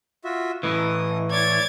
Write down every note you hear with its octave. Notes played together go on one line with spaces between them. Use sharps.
F4 F#4 E5
A2 E3 D#5 D#6
C#5 D5 G#6 A6